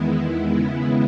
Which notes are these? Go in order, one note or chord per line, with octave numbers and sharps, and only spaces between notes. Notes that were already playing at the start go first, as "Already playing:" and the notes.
Already playing: E2 D#3 G#3 B3 E4
C#3 G#3 B3